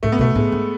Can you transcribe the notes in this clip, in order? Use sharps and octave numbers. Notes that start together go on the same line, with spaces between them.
A2 A3
B3
B2 A3
A2 G#3
G#2